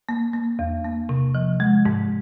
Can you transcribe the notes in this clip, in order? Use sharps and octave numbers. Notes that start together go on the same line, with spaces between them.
A#3
A#3
E2
A#3
C3
F3
G#3
G#2